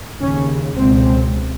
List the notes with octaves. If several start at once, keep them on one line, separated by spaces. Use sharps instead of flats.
D#2 C#3 C#4
C#2 B2 C4